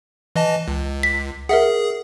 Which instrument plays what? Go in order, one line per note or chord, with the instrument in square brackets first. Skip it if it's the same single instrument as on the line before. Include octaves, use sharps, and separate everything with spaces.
[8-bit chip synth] E3 D#5 A5
C#2
[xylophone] B6
[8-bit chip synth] G#4 [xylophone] A#4 E5 F#5